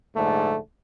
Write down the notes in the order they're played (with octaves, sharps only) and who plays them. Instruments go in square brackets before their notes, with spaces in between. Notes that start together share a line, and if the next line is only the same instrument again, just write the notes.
[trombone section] A#1 G#2 D3 A3